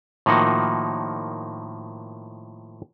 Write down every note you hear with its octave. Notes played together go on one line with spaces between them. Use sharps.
A2 D#3 F3 A#3 D#4 F#4